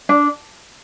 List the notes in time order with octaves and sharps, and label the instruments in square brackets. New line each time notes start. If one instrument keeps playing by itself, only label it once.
[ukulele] D4